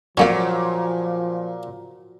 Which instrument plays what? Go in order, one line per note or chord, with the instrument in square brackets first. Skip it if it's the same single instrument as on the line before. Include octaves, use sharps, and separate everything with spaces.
[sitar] A#2 [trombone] F3 [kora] F#3 C#5 D5 [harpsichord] A3 A#3 C#4